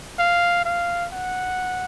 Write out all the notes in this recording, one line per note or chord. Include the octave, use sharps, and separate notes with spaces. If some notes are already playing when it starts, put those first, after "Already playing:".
F5
F5
F#5